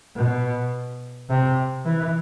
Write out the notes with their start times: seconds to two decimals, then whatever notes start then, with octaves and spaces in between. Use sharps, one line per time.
0.15 B2
1.29 C3
1.85 E3